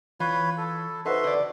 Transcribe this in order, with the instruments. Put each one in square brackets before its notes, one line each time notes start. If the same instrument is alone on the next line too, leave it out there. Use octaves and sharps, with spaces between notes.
[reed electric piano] E3 [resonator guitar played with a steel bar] F4 [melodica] B4 C#5 B5
[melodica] A4
[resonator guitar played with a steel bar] D#4 [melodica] F#4 E5 C6 [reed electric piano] A4 B4 C5
[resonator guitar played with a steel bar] D3 D5